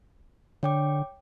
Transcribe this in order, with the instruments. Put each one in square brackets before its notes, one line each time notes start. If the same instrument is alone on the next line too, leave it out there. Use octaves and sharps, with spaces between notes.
[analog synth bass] D3 [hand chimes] C#5 G5 D6